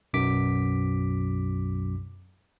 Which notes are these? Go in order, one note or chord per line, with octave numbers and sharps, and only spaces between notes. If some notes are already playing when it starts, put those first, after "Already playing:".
B1 F#2 D6 B6